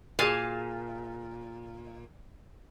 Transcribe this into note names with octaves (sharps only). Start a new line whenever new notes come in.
A#2 F#4 G#4 F5 G#5 A5